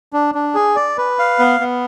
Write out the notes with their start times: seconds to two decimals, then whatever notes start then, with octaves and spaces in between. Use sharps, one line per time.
0.13 D4
0.35 D4
0.55 G#4
0.76 D5
0.98 B4
1.19 F5
1.39 B3
1.60 B3